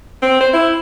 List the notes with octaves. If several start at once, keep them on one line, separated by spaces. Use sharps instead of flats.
C4
C5
E4